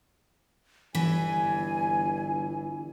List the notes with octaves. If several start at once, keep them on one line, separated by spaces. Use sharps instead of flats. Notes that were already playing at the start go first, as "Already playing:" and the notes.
G1 E3 G#5